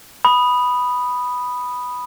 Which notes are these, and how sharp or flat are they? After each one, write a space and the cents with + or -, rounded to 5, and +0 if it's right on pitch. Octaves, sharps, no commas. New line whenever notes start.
B5 +0 D#6 -10